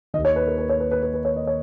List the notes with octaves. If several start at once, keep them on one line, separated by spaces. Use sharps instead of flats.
D#2 D#3 D#5
C#5
B4
A#4
B4
C#5
B4
B4
B4
B4
C#5
D#5
C#5